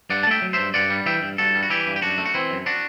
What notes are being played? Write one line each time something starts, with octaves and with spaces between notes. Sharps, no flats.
G2 D5 F#5
A5
A3 E5 G5
F#3
G2 C5 E5
G2 D5 F#5
G3
E3 E5 G5
G2
G2 F#4 A4
G3
F#4
E3 E4 G4
G2
G4
F#2 D4 F#4
A3
F#4
E3 C4 E4
F#2
D4 F#4